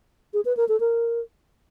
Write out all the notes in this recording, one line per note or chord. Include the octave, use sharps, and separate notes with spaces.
G#4
B4
A#4
A4
A#4